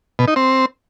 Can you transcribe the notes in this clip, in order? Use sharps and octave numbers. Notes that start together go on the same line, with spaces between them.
B2
D#4
C4